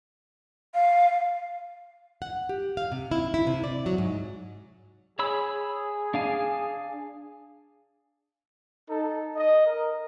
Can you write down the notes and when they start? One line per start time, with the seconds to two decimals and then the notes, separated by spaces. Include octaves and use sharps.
0.74 F5
2.22 F#5
2.49 G4
2.77 F5
2.92 C3
3.11 E4
3.34 E4
3.47 C3
3.64 D5
3.86 F#3
3.98 G#2
5.19 G#4 C#5 B5 E6
6.14 D4 F5 G#5
8.90 D#4 A4
9.36 D#5
9.66 A#4